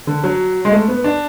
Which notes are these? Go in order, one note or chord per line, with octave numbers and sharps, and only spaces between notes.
D3
F#3
G#3
A3
B3
D4